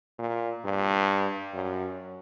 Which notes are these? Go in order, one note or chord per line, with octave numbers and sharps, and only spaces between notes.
A#2
G2
F#2